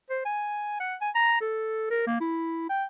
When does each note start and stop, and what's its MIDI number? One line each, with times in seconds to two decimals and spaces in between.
0.10 0.22 72
0.25 0.76 80
0.80 0.96 78
1.01 1.10 80
1.15 1.38 82
1.41 1.91 69
1.91 2.04 70
2.07 2.17 58
2.21 2.67 64
2.70 2.85 79